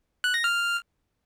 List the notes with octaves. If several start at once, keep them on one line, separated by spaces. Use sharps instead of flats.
F#6
A#6
F6